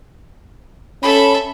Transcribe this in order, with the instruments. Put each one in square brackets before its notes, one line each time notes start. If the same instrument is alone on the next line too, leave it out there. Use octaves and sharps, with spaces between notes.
[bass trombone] C#4 [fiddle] A4 E5 [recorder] B5